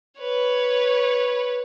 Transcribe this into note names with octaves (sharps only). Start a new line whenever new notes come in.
B4 C#5